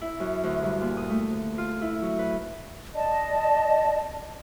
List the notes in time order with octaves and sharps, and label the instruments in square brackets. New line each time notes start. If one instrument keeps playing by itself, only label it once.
[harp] E4
F#2
D2
G2
A#2
D#6
A3
D2
F4
E4
F#3
B4
[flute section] D5 D#5 A5